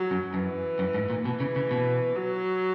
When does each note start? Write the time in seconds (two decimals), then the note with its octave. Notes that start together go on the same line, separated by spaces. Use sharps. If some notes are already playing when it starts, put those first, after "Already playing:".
Already playing: F#3
0.11 F#2
0.34 F#2 E3
0.79 F#2
0.94 G#2
1.10 A#2
1.25 B2 E3
1.40 C#3
1.56 C#3
1.71 B2
2.16 F#3